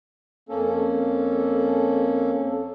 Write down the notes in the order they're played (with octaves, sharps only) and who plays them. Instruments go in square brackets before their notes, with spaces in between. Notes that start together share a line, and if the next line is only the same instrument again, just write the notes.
[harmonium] F2 A#3 C#4 A4